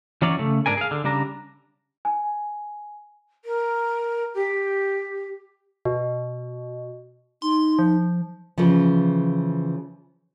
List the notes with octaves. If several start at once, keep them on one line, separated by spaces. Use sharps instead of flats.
E3 F#3 C#4 C#5 D5
C#3 A3
G#2 B2 D4 A#4 G#5
G#4 F5
D3
C#3 G3 D4 A#5
G#5
A#4
G4
B2
D#4 C6
F3
C#3 E3 F3